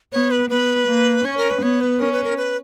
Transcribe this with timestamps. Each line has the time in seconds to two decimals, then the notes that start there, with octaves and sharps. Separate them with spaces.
0.12 B3 C#5
0.31 B4
0.50 B3 B4
0.88 A#3
1.25 C#4 C#5
1.37 A#4
1.50 B4
1.62 B3 C#5
1.81 B4
2.00 C#4 A#4
2.12 B4
2.24 A#4
2.37 B4